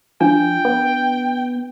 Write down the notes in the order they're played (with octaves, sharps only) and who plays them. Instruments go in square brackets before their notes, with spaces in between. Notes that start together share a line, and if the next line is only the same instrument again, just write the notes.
[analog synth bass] F3 [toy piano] D4 [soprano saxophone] G5
[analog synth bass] B3